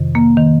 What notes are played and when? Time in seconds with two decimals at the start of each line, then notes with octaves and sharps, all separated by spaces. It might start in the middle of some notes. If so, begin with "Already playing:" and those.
Already playing: F2 C3 D#3
0.15 A#3
0.37 D#3